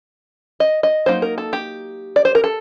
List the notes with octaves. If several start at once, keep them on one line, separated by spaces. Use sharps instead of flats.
D#5
D#5
F#3 A#3 D#4 C5
A#4
A4
G4
D5
C5
A#4
A4